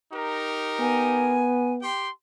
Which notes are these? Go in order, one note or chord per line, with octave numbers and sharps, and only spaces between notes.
D#4 G4 A#4
B3 G#5
G4 G5 C6